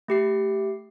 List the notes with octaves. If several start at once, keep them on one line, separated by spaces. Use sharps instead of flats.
A3 G4 C7